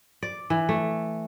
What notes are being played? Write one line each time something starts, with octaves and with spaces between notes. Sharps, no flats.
D5
E3
A3